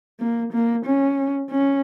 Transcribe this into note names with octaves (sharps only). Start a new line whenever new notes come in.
A#3
A#3
C#4
C#4